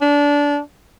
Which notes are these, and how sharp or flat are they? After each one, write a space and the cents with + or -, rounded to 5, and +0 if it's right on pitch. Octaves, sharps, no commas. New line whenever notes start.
D4 -20